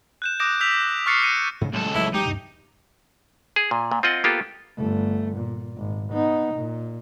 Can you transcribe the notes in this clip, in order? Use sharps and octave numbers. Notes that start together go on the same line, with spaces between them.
F#6 G6 E7
D6 D#6 G6 A#6 D7 E7
E6 G6 B6 F7
C#6 F6 F#6 A6 C7 C#7
C#7 D#7
G#2 C#3
C#2 A2 F#3 G3 A4
A1 F#3 E4
G#3 D#4 G4
D2 G2 C3
G#4
A#2
A#2
C4 F4 D#5 F#5
A#3 B3 F4 G4 A4
G1 A3
A#2
G#1
B3 D#4
A#2